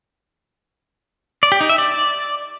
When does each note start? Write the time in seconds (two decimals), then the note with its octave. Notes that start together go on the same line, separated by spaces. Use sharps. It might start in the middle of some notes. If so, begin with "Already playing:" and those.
1.43 D5
1.52 G4
1.61 D#4
1.69 E5
1.78 D5